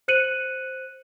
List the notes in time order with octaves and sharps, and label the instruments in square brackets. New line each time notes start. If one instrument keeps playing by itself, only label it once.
[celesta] C5 F#6 C#7 D#7 F#7